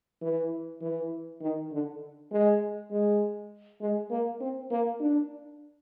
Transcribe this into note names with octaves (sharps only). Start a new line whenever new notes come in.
E3
E3
D#3
D3
G#3
G#3
G#3
A#3
C4
A#3
D4